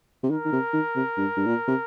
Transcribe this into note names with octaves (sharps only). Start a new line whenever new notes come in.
C3
D#3 A#4
D#3
C3
D#3
C3
G2
G2
A#2
C3